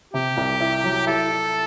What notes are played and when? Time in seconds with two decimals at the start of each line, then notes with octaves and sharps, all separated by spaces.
0.14 C3 G4
0.37 C2
0.60 E4
0.83 F#3
1.07 E4 A4
1.30 E4